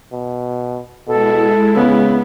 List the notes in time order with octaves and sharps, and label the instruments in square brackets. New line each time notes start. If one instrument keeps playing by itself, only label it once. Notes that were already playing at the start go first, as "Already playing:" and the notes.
[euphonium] B2
[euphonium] B2 [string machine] G#3 E4 [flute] A4
[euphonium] C#3 [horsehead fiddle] B3